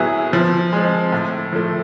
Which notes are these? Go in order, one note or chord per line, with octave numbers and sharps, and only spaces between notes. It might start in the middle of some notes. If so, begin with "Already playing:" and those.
Already playing: A2 F#3 B3 E4 G#4
F3
G#3 C4
A2
F3 A3